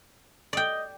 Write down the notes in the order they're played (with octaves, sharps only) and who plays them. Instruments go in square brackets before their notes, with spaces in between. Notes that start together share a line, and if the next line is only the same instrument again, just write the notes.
[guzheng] D5 G5 [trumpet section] D#5